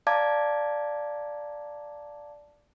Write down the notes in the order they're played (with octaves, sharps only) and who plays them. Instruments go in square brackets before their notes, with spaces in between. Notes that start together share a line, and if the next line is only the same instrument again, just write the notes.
[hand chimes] D5 F5 A5 A#5 D6 G#6